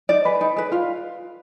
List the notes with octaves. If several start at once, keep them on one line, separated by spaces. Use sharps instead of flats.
D#4 D5
G#4 B4
D#4
G#4 B4
F4 F5